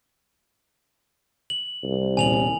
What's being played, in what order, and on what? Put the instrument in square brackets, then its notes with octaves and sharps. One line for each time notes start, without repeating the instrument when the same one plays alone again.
[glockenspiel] F#7
[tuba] C2
[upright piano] D#1 E2 [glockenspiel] G#5 F7 F#7